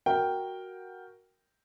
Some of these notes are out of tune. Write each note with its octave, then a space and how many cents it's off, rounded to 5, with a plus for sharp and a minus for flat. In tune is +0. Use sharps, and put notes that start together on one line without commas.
F#4 +0 A#4 +0 G5 +0